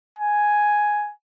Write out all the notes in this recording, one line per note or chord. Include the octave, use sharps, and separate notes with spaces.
G#5